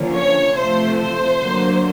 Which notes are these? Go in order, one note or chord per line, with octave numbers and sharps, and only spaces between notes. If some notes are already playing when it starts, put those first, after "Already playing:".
Already playing: D3 F3 A#3 C#4
C#5
C3 F3 A3 C5
C5
D3 F#3 A#3